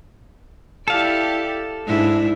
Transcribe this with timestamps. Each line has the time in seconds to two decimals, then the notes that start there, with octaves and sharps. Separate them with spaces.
0.88 E4 G4 A4 D5 F5
1.87 G#2 D4 E4